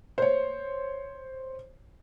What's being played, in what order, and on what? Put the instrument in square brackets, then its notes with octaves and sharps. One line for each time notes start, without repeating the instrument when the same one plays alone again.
[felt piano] C5 C#5